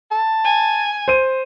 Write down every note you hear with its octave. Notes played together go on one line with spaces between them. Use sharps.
A5
G#5
C5 D#7